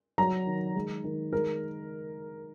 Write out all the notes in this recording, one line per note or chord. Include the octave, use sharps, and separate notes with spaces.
F#3 A#5
D#3
G#3
D#3
G#3 A#4